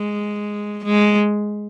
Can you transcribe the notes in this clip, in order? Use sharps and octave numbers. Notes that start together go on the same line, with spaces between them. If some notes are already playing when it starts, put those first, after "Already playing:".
Already playing: G#3
G#3